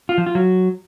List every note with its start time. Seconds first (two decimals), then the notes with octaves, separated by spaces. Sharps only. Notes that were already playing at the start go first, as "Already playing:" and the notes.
0.09 F4
0.18 F3
0.26 F4
0.35 F#3